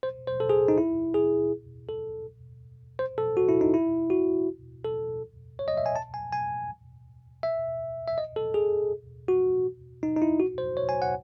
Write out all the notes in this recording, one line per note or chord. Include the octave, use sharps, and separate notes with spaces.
C5
C5
A4
G#4
D#4
E4
G#4
A4
C5
A4
F#4
E4
D#4
E4
F#4
A4
C#5
D#5
E5
G#5
A5
G#5
G#5
E5
E5
D#5
A4
G#4
F#4
D#4
D#4
E4
F#4
C5
C#5
G#5
F#5